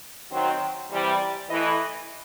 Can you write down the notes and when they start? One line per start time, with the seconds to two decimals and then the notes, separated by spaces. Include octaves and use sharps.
0.31 D#3 F#3 C4
0.91 C3 E3 G3
1.50 E3 A3 E4 B4 D#5